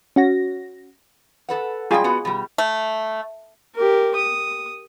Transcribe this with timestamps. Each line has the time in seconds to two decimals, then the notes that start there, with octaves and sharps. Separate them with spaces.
0.16 C#4 F#4 A#6
1.49 A4 B4 F#5
1.91 A2 G3 F4 G#4 G5
2.04 B3 F#4
2.25 B2 G3
2.58 A3
3.75 G4 A#4
4.15 D#6